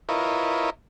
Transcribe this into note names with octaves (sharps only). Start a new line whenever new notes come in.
E4 F4 A#4 B4 C#5 D#5